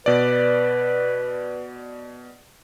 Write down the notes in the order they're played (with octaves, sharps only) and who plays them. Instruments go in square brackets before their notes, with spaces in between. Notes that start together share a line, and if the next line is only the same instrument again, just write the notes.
[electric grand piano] B2 D5 [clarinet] B4